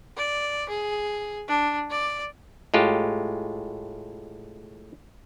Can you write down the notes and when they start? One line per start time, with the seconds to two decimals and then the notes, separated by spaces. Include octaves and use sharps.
0.17 D5
0.69 G#4
1.48 D4
1.90 D5
2.74 A2 G#3 F4 G4